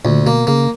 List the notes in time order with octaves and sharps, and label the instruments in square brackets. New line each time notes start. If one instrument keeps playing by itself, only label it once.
[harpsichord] D2 [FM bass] A#2
[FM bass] B2 [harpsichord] A#3
[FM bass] C#3 [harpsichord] A#3